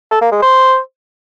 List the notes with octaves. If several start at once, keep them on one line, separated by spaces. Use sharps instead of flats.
A4
A#3
G#3
C5